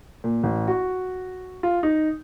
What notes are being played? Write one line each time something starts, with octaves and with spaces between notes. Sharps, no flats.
A#2
A1
F#4
F4
D#4